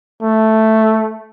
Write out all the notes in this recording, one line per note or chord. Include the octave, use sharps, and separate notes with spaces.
A3